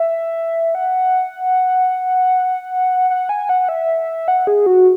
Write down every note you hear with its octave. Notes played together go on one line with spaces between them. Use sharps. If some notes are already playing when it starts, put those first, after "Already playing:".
Already playing: E5
F#5
F#5
G#5
F#5
E5
F#5
G#4
F#4